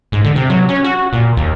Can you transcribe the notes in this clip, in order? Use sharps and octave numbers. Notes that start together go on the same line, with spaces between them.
G#2
D3
C3
F#3
C#4
F#4
A#2
D#2